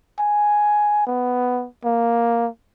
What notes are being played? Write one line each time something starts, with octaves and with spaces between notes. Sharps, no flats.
G#5
B3
A#3